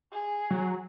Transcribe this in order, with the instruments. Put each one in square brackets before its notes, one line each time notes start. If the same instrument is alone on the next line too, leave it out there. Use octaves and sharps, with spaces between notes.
[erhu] G#4
[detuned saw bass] F#3